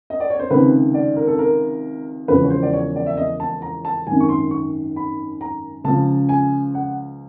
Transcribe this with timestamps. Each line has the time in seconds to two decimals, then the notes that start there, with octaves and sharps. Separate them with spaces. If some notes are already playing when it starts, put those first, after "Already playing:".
0.10 D#5
0.20 D5
0.30 C#5
0.39 C5
0.50 C#2 C3 D#3 B4
0.94 D5
1.16 A#4
1.27 A4
1.39 A#4
2.28 E1 E2 C#3 F3 B4
2.43 C#5
2.50 C5
2.63 D5
2.73 C#5
2.96 D5
3.06 E5
3.17 D#5
3.40 A5
3.62 A#5
3.85 A5
4.07 G#1 F#2 D#3 G#5
4.20 C#6
4.29 C6
4.51 C#6
4.96 B5
5.41 A#5
5.84 C#2 C#3 F3 A5
6.29 G#5
6.75 F#5